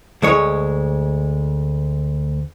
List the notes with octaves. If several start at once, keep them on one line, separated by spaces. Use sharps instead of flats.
D2 G#3 C#5